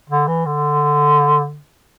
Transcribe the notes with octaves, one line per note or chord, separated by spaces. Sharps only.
D3
E3
D3